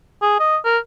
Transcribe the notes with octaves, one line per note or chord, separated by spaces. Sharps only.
G#4
D#5
A#4